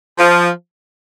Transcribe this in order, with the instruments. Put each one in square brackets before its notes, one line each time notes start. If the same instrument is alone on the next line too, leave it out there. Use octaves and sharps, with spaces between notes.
[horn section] F3